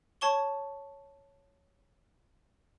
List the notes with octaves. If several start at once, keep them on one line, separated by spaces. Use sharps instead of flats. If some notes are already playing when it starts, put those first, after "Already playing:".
C#5 A5 C#6 G7